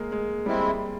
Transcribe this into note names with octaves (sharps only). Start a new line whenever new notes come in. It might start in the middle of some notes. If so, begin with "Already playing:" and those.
Already playing: G#3 A#3
G#3
G3 G#3 C4 E4